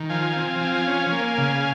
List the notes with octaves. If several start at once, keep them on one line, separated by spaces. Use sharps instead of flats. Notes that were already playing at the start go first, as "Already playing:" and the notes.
Already playing: D#3
F3 F5 G#5
C4
F3
C#4
A#3
C#3